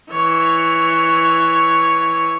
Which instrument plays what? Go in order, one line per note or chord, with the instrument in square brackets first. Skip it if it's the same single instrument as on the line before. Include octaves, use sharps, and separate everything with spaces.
[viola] E3 C#5